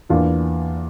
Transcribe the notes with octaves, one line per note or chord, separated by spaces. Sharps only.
E2 E3 A#3 D4 F4